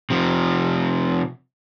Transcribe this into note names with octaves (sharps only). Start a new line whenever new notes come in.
C3 F3